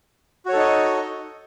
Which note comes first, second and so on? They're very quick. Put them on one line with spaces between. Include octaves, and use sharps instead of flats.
F#4 C#5 A4 D#4 D#5